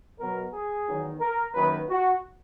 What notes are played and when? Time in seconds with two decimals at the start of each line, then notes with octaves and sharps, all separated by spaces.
0.18 B2 F#3 B3 A#4
0.52 G#4
0.86 E2 D#3 F#3
1.20 A#4
1.54 F#2 D#3 A#3 B4
1.87 F#4